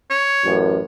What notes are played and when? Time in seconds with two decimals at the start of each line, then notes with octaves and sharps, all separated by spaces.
0.10 C#5
0.43 A1 F#2